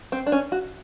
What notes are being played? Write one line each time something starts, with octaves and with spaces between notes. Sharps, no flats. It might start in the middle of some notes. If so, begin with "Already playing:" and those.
C4
D4
C#4
F#4